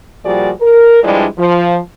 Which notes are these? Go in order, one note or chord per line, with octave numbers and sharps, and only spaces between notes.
A#2 F3 G3 F#4 G#4 D5
A#4
G2 F3 G3 G#3 D4 E4
F3